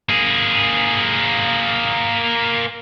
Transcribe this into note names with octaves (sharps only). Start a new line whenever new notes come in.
A#3 G#4